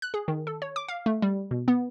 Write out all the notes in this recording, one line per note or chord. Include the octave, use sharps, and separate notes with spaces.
F#6
G#4
D#3
A4
C#5
D6
F5
A3
G3
B2
B3